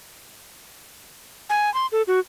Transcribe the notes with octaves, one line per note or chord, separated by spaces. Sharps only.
G#5
C6
A4
F#4